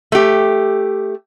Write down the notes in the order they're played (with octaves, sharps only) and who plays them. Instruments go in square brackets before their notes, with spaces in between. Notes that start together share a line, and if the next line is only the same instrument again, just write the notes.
[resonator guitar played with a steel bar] A3 G4